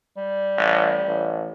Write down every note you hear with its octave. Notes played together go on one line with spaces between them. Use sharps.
G3
A1
A1